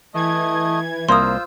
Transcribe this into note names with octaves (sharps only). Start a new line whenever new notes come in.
E3 A3 D#5 G#6
C2 A#3 F4 C5 C6 D#6 E6